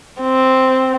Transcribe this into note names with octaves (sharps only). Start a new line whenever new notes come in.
C4